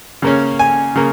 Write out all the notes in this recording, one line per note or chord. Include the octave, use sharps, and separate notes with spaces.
C#3 A#3 C#4
G#5
C#3 A#3